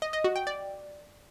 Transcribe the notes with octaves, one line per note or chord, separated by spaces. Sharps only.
D#5
D#5
F#4
G5
D5